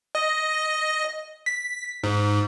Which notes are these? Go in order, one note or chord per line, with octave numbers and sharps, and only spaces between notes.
D#5
B6
G#2